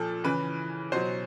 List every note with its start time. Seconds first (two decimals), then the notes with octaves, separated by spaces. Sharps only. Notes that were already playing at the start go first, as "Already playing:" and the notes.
Already playing: A#2 F3 A4
0.24 C#3 E3 B4
0.92 B2 F#3 C5